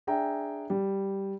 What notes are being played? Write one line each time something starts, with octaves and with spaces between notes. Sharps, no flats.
D4 G#4 E5 G5 G#5 A#5
G3